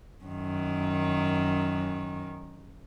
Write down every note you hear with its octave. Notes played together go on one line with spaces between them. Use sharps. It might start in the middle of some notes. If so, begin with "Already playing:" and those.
F#2 D#3